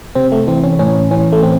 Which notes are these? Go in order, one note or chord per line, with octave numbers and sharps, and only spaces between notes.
C3 C4
A3
E3 C4
C#4
A2 C#4
E3 C#4
A3
A2 C4